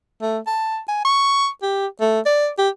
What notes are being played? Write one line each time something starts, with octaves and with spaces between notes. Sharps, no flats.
A3
A5
G#5
C#6
G4
A3
D5
G4